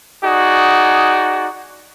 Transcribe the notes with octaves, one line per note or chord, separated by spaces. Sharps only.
D#4 F#4 G#4 D5